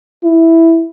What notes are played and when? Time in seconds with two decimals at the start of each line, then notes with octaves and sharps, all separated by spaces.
0.24 E4